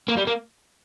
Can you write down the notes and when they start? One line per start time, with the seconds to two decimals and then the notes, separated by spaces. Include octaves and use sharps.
0.09 A#3
0.17 G3
0.27 A#3